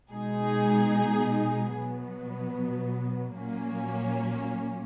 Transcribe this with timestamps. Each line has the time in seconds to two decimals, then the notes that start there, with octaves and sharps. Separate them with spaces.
0.11 B2 G#3 D#4 G#4
1.73 B2 F#3 B3
3.36 A#2 F#3 A#3 C#4